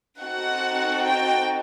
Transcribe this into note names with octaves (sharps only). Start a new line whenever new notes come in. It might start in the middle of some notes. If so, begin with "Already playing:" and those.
C4 D#4 F#4 A4 F#5
G5